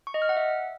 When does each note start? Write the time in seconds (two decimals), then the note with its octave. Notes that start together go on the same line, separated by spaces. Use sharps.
0.07 C#6
0.14 D#5
0.22 F6
0.29 F#5
0.37 E5